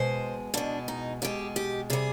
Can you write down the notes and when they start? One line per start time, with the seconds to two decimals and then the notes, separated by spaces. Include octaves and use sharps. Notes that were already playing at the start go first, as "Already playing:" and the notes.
Already playing: B2 G#3 C5
0.54 B2 G#3 D4
0.88 D#4
1.22 B2 G#3 G4
1.56 G4
1.90 C3 G3 G#4